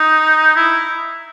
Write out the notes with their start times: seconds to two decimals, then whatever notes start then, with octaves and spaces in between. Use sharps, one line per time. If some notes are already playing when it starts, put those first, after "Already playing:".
Already playing: D#4
0.56 E4